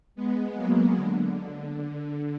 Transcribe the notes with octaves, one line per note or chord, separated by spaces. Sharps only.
G#3 B3
F#3 A#3
D3